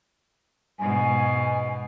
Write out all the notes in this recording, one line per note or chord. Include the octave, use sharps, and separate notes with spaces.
G#2 B2 G#5